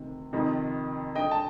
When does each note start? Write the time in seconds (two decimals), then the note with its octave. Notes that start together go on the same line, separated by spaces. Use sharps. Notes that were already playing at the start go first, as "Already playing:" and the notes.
Already playing: D2 C3 D#3
0.33 F2 C3 D#3
1.15 G2 D3 D#5 G5
1.31 A5